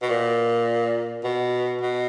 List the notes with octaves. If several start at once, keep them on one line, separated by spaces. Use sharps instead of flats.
B2
A#2
B2
B2